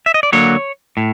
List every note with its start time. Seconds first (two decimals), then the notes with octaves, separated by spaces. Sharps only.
0.06 E5
0.14 D#5
0.23 D5
0.33 D3 F#3 A#3 C#5
0.97 A2